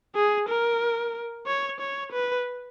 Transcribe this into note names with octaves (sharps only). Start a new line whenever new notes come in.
G#4
A#4
C#5
C#5
B4